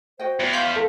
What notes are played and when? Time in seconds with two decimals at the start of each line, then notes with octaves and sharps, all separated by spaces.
0.19 F#4 C5 D#5 G5
0.40 E2
0.53 F5 C6 G6 B6
0.75 A4 A#4